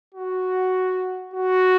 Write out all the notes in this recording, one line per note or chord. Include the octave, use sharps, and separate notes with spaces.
F#4
F#4